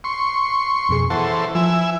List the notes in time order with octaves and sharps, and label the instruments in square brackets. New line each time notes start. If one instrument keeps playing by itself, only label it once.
[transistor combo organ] C6 C#6
[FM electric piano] F2 B2 G#4
[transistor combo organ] E3 A4 C5 [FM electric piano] F#5 A5 C#6
[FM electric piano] F3 [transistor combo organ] E4 E5 G#5